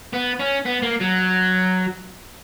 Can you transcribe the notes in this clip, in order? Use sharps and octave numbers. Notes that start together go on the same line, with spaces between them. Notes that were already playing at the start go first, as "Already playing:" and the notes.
B3
C#4
B3
A#3
F#3